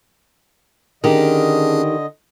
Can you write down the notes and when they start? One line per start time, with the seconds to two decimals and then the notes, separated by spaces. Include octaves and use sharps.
1.04 D3 D#3 C#4 D4 G4 G#4 D#5